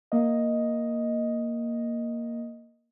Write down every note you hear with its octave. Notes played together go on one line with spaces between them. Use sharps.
A#3 D#5